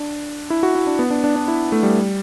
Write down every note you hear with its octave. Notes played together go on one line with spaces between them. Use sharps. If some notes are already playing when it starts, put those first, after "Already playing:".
Already playing: D4
E4
F#4
E4
D4
B3
D4
D4
D4
E4
A3
G3